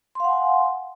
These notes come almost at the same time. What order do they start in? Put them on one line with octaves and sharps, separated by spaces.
C6 F5 F#5 G#5